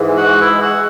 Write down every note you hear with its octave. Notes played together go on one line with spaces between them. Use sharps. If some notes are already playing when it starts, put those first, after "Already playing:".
Already playing: G#2 E3 G#3
F#4
E4
F#4